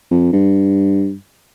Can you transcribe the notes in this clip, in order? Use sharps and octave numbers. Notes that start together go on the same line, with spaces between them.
F2
G2